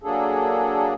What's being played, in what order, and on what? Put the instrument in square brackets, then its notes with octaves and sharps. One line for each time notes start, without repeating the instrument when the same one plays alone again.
[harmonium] F#3 A#3 D4 G#4 A4